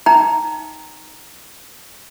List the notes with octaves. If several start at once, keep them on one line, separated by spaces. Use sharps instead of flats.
D#4 G5 A#5